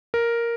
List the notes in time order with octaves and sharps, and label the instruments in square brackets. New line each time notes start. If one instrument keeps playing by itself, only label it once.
[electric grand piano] A#4